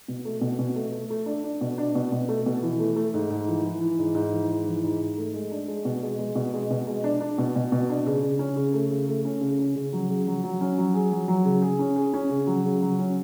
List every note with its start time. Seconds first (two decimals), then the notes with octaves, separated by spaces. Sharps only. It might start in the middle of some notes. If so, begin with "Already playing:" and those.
0.08 B2
0.25 A3
0.41 B2
0.59 B2
0.76 A3
0.92 A3
1.10 A3
1.26 D4
1.44 D4
1.61 B2
1.78 D4
1.95 B2
2.12 B2
2.28 A3
2.46 B2
2.62 E3
2.79 A3
2.96 A3
3.14 G#2
3.30 G#2
3.48 E3
3.64 E3
3.81 E3
3.99 G#2
4.15 G#2
4.33 E3
4.49 G#2
4.66 E3
4.83 G#2
5.00 G#2
5.18 A3
5.34 G#3
5.51 D4
5.68 G#3
5.85 B2
6.03 G#3
6.19 G#3
6.35 B2
6.54 G#3
6.71 B2
6.87 G#3
7.04 D4
7.21 D4
7.38 B2
7.55 B2
7.72 B2
7.89 D4
8.06 C#3
8.23 C#3
8.39 C#4
8.56 C#3
8.73 A3
8.91 C#3
9.08 A3
9.25 C#4
9.41 C#3
9.59 C#4
9.76 C#3
9.93 F#3
10.09 C#3
10.27 F#3
10.44 F#3
10.61 C#4
10.78 F#3
10.94 G#4
11.12 F#3
11.28 F#3
11.45 C#3
11.62 G#4
11.79 C#4
11.96 G#4
12.14 C#4
12.30 C#3
12.47 F#3
12.65 C#3
12.82 F#3
12.99 C#4